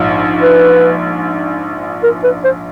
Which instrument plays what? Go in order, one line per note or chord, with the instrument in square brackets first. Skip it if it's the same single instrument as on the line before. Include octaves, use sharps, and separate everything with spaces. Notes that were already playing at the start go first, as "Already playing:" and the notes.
Already playing: [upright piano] A#1 G#2 F3
[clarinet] B4
A#4
B4
C5